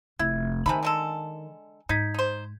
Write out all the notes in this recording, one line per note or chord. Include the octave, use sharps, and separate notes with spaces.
F1 E4 G#6
C3 D#3 A3 G#5 A#5 B5
D3 G#3 A4
G#2 D#4 G6 G#6 B6
D#4 C5